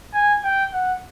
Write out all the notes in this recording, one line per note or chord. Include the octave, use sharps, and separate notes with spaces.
G#5
G5
F#5